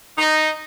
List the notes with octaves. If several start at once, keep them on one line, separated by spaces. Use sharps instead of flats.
D#4